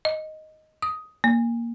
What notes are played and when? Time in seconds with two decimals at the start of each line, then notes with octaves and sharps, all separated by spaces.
0.05 D#5
0.82 D#6
1.24 A#3